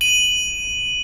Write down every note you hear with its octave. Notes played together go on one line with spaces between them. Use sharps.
D#7 F#7